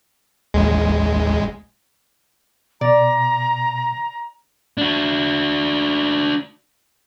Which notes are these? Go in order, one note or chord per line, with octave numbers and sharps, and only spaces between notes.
A1 D#2 G#3
B2 D5 A#5
D4 F#4